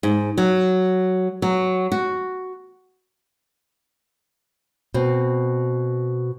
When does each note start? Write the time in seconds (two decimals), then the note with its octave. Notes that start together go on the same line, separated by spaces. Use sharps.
0.03 G#2
0.38 F#3
1.42 F#3
1.92 F#4
4.94 B2 C4